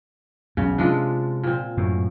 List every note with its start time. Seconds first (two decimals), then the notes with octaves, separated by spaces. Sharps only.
0.57 B1 E2 C#3
0.78 C3 F3 G#3 D4
1.43 A#2 C4
1.77 F#2 A2